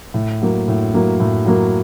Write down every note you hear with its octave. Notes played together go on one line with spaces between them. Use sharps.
A2
F#3 A#3
A2
F#3 A#3
A2
F#3 A#3